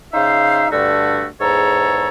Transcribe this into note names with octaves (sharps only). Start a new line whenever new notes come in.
C#3 D#4 C5 E5 F5
G2 D3 A3 F#4 E6
E2 G#2 A4 C#5 A#5